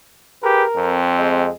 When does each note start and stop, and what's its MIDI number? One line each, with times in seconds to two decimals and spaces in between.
0.43 0.64 67
0.43 0.64 68
0.43 1.02 70
0.43 0.64 71
0.77 1.50 41
0.77 1.50 60
1.19 1.51 56